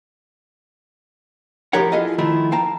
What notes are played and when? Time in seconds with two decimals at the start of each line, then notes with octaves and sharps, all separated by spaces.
1.73 A2 F3 G4 A#4 C#5 F#5
1.92 E4 F4 G#4 A4 D#5 F5
2.18 D#3 F3 A3 E4 F4
2.52 F5 G5 A5 A#5